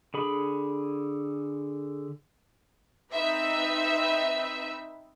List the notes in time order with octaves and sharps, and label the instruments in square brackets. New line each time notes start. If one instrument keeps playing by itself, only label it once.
[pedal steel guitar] D3 G#4 B5
[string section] C4 D#4 B4 E5